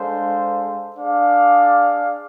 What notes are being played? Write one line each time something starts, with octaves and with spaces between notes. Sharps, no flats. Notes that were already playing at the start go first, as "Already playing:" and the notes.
Already playing: G#3 D4 A4 C5 F5
D4 G#4 D5 F5